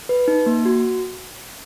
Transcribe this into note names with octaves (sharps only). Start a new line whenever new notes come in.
B4
D#4
A#3
F#4